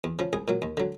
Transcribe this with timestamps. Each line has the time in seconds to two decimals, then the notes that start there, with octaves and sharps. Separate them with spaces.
0.04 E2
0.19 C#3 F3
0.33 C2 G#4
0.48 A#2 F#3
0.62 D#2
0.77 D3 F#3